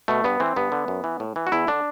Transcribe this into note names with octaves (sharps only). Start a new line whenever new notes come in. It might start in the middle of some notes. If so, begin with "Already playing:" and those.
B2 A3
G2 B3
E3 C4
G2 B3
D3
F#2
E3
A2
E3
F#4
E2 E4
D3 D4